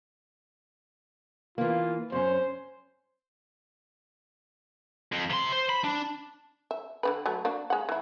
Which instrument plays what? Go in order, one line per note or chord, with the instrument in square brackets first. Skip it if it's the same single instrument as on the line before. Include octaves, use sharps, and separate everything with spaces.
[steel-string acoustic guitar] E3 A#3 [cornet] F4
[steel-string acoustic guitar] F#2 C#4 [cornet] C5
[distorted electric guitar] F2
C3 C6
C5
B5
D4
[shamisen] E5
D3 D#3 B4
F#3 A3
A#3 D4 F#4
G#3 F#5
E3 E4